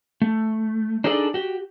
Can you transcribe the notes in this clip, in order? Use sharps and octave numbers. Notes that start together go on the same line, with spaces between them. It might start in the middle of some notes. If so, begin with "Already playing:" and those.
A3
D4 D#4 G#4 A4 C#5 D5
F#4 G4